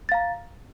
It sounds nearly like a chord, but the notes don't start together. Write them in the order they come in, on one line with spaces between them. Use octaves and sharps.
A6 F5 A#5